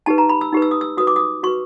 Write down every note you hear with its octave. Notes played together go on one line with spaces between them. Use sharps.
D#4 G4 B4 A5
A#5
B5
E6
D#4 G4 B4
E6
D#6
E6
F#4 B4 D#6
D6
D#6
F#4 B4 C#6